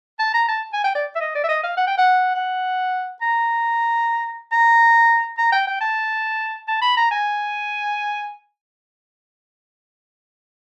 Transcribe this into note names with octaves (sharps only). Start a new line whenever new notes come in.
A5
A#5
A5
G#5
G5
D5
E5
D#5
D5
E5
D#5
F5
F#5
G5
F#5
F#5
A#5
A#5
A#5
G5
G5
A5
A5
B5
A#5
G#5